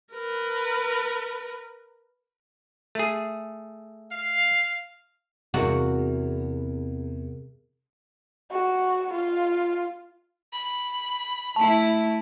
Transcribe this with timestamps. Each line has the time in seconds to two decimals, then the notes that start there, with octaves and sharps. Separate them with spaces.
0.13 A#4 B4
2.95 A3 G#4
4.12 F5
5.54 E2 C3 F#4 G#4 A#4
8.51 F#4
9.13 F4
10.53 B5
11.56 A3 E4 A5